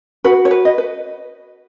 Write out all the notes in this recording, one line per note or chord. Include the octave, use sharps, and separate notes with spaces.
F#4 B4
C#5
B4
D#5
B4